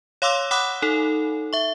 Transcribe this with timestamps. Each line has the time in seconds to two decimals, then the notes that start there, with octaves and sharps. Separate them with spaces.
0.22 C#5 F5 C6 D6 E6
0.51 F#5 B5 D6 D#6 F#6
0.82 D#4 A4
1.53 E5 C#6